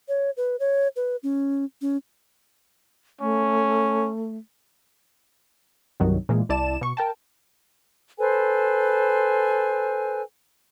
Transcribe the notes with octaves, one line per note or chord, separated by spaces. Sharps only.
C#5
B4
C#5
B4
C#4
C#4
A3 C#4
C2 G2 D#3 F#3
A#2 E3 G#3 A#3
C2 E4 D5 A5 E7
B2 C#6
A#4 G5 A5
A4 B4 C5 G#5